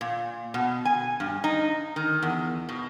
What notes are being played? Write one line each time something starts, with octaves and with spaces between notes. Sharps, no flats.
A#2
B2
G#5
G2
D#4
D#3
E2
B2